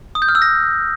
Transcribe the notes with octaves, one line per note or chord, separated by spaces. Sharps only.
D#6
G6
F6
E6
A#6